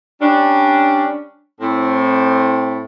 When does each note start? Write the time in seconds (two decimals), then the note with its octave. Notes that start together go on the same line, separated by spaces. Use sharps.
0.22 G3 C#4 D4
1.61 A2 C4